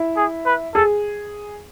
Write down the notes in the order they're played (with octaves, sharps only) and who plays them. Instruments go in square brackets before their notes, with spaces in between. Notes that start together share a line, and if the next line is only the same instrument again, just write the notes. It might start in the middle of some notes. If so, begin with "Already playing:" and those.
Already playing: [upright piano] E4
[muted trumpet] G#4
B4
[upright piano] G#4 [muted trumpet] A4